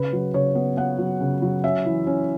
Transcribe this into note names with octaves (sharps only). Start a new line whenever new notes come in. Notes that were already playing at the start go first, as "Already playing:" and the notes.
Already playing: C#3 B4
F#3
C#3 C#5
B3
B3 F#5
F#3
C#3
F#3
C#4 E5
E3
C#4